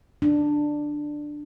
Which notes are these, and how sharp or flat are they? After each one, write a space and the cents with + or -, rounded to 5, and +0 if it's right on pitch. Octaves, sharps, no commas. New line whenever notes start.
D4 +10